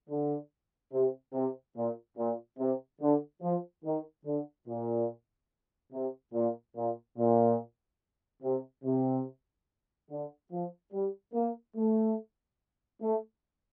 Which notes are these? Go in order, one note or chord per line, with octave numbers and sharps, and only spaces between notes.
D3
C3
C3
A#2
A#2
C3
D3
F3
D#3
D3
A#2
C3
A#2
A#2
A#2
C3
C3
D3
F3
G3
A#3
A3
A3